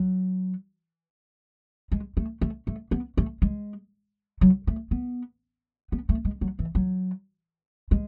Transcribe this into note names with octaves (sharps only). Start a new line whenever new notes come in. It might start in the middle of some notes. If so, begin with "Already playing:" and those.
Already playing: F#3
G#3
A3
A3
A3
B3
A3
G#3
F#3
A3
B3
B3
A3
G#3
F#3
E3
F#3
G#3